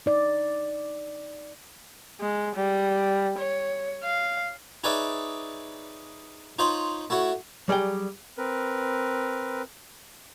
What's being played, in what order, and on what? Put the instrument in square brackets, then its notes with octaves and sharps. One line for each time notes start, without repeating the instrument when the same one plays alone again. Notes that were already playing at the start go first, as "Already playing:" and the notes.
[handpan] D#4 D5
[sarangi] G#3
G3
C#5
F5
[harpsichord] D#4 G#4 B4 C#5 D5 E5
D#4 F4 C5 C#5 B5 C6
A3 E4 F#4 C#5
[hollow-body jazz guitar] F#3 G3 G#4 D5 G5
[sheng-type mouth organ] C4 A#4 B4